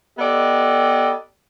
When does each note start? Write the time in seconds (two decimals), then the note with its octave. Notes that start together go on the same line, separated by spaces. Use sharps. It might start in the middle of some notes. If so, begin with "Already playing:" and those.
0.18 B3 G4 A4 D5 D#5